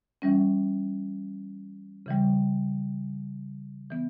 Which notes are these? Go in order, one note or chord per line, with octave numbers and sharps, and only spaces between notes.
E3 G3 C#4
C#3 E3 G3
E3 B3